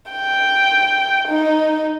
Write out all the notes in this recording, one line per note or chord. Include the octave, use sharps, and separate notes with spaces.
G5
D#4